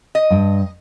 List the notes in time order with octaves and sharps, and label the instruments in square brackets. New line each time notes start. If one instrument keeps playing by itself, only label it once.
[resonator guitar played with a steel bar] D#5
[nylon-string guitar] G2 G5 A5